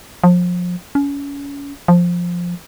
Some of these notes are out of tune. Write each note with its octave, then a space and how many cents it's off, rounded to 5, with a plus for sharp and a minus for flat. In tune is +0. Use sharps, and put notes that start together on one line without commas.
F3 +30
C#4 +30
F3 +5